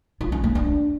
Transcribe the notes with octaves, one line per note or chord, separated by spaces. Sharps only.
F4
C#4
A#3
D4